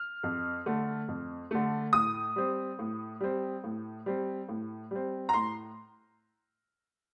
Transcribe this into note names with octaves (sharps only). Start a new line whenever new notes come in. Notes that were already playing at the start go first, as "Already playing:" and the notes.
Already playing: F6
F2
D3 A3
F2
D3 A3
A2 D#6
G3 C4
A2
G3 C4
A2
G3 C4
A2
G3 C4
A#5
A2 C6